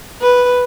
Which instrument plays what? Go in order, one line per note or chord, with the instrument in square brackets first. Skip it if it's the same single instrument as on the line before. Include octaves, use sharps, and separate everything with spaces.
[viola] B4